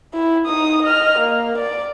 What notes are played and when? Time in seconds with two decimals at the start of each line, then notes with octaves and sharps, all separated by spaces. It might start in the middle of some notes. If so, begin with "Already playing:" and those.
0.14 E4
0.46 D#4 D#6
0.83 D#5 F6
1.20 A#3
1.58 D5